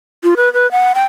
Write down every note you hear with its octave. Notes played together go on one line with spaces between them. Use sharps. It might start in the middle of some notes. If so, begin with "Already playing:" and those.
F4
B4
B4
F#5
G5